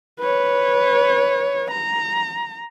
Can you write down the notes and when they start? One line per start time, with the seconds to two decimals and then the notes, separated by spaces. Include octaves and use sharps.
0.20 B4 C#5
1.71 A#5